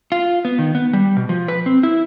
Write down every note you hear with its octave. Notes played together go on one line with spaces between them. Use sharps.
F4
B3
D#3
B3
G3
B2
F3
B4
C4
E4